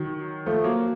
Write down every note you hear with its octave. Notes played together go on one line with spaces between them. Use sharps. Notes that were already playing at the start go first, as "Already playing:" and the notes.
Already playing: D#3 F#3
F3 A3
F#3 A#3